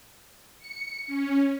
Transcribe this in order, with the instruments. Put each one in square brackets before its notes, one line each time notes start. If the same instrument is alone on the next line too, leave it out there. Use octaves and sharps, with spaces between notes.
[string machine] C#7
C#4